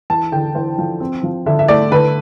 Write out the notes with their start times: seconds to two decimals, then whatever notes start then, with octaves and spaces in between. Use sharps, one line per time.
0.10 E2 A5
0.32 D3 G5
0.55 E2 C5
0.78 F3
1.00 C4
1.23 F3
1.46 D3 E5
1.59 E5
1.68 A3 D5
1.91 D3 B4